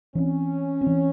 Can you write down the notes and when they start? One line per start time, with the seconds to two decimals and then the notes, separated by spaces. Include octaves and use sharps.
0.15 E3 C4 C#4
0.81 C4
0.87 E3